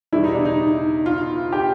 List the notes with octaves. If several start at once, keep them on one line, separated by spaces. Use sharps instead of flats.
E2 B2 G3 E4
D#4
D4
D#4
F4
G4